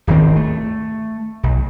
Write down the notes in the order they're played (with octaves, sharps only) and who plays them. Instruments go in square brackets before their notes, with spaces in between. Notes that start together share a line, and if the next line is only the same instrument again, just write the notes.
[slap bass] D1 G#1 D#3 C4
A3
B1